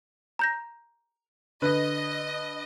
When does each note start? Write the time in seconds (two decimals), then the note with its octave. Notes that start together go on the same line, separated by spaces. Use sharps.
0.39 A#5 G6 A#6
1.62 D3 B4 D#5